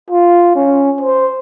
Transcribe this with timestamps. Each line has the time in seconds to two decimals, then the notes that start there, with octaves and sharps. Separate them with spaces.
0.10 F4
0.56 C#4
1.01 C5